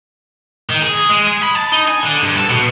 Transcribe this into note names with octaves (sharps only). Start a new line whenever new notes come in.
D#3
G#4
G#3
G#4
B5
A5
D#4
G#5
D3
G2
A4
B2